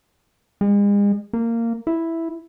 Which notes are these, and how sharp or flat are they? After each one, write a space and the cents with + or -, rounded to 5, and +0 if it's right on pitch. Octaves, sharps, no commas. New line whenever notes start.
G#3 -40
A#3 -15
E4 +0